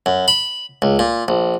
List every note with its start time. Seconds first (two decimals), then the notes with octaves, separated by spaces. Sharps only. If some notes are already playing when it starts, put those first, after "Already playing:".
0.06 F#2
0.28 B5
0.82 C#2
0.99 A#2
1.28 A#1